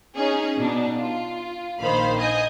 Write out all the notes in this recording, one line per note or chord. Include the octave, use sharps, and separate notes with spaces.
C#4 D#4 G#4
B2 D4 D#4
F4
A#1 A#2 D#3 C5 F5 B5
D#5 G#5 D#6 G6